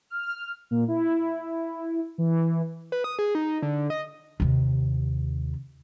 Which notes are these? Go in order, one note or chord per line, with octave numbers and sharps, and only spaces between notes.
F6
A#2
E4
E3
B4
D#6
G#4
D#4
D3
D#5
D#2 C3